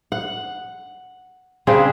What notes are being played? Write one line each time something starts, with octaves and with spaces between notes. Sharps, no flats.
F#5
C#3 C4 D4 G#4